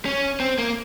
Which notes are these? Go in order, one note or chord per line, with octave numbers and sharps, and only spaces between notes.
C#4
C4
A#3